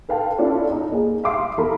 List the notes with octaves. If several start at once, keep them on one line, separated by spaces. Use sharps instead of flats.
A4 B4 F5 G5 A5
C#4 D4 E4 F4 A4 D5
D#4 A4
A#3 G#4
E5 F5 C6 D6 D#6 C7
E2 A4 A#4 B5